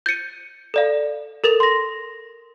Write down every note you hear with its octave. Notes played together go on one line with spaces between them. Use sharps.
G6 A6 C#7 D#7
A4 D5 F5
A4 A#4 A6 F7
C6 A#6